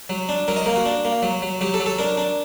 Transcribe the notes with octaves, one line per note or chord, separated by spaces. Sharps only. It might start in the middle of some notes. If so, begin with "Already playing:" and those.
F#3
D4
F#3 A#4
D#5
A#3 A#4
F#4
D4
A#3
F#3
F#3
F#3 G4
A4
F#3
A4
D4 A#4
D4